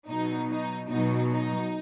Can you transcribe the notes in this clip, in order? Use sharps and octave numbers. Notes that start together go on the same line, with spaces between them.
B2 F#3 D#4
D#4
B2 F#3 D#4
D#4